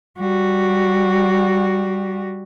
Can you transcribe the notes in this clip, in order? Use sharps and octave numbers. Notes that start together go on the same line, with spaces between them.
G3 F#4